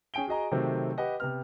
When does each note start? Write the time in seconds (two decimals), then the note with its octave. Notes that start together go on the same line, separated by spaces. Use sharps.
0.14 C#4 G#4 G5 D7 G7
0.28 F#4 G#4 D#5 A#5
0.51 C3 D#3 F#3 A3 C4
0.98 G4 B4 D#5 F#5
1.20 C3 B3 F6